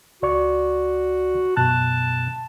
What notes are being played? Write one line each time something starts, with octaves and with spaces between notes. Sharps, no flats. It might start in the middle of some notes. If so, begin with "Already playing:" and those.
C#2 F#4 D5 C#6
F#2 B2 A5 F#6